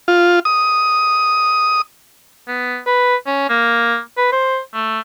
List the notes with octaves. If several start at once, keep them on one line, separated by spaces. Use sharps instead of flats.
F4
D#6
B3
B4
C#4
A#3
B4
C5
A3